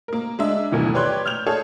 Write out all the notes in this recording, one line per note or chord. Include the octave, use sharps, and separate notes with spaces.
A#3 A#4
G#3 D4 E5
F#1 D2 B2 D#3 E3
G4 B4 C#5 D5 C6 F#6
F6 G6 F7
G#4 A4 C#5